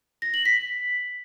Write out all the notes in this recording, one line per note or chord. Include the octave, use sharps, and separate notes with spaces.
A#6
F#7
B6